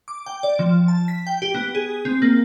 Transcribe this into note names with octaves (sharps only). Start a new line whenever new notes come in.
D6
G5
D5
F3
A5
B6
G5
G4
B3
G#4
C4
A#3